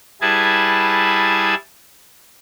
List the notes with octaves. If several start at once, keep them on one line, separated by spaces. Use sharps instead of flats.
G3 E4 G#4 B4 A5 G#6